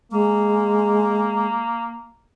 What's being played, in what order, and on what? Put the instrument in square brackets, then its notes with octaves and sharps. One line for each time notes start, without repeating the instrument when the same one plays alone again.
[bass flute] G#3 [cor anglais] A#3